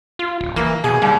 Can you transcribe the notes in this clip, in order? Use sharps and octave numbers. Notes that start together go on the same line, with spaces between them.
F4
D1
E3 A#3
B2 G#4
D#2 G3